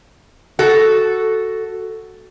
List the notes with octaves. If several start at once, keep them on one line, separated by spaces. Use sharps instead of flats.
F#4 A4